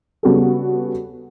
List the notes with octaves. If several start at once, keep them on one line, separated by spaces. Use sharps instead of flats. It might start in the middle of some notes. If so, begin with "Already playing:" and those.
C#3 G3 B3 F#4 A4